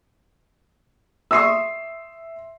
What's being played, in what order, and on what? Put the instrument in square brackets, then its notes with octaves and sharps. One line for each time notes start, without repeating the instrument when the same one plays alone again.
[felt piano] E5 C6 C7 [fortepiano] C#6 D#6 E6